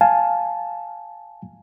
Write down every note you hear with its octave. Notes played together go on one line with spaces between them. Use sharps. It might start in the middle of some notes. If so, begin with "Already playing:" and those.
F5 G#5 A5